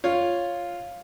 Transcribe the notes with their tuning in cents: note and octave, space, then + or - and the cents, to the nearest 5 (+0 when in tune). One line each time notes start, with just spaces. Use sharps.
F4 +0 C#5 -5